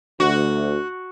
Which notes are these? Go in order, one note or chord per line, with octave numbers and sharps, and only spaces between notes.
D2 F#4